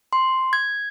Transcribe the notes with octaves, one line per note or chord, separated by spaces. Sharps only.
C6
G#6